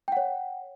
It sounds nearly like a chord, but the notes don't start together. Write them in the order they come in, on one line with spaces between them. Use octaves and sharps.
G5 F#5 C#5